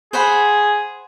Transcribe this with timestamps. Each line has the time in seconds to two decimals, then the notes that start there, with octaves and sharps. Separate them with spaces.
0.13 G#4 C5 F#5 B5